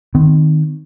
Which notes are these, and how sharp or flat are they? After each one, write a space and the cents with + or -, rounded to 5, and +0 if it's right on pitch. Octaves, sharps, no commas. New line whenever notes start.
D#3 -10 C4 -40